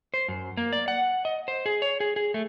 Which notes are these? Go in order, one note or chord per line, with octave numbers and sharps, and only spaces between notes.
C5
F#2
A#3
D5
F#5
D#5
C5
G#4
C#5
G#4
G#4
A3